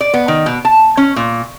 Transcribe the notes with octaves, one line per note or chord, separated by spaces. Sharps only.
D5
B3
D#3
B2
A5
C#4
A#2